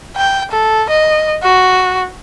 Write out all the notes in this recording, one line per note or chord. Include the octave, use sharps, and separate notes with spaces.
G5
A4
D#5
F#4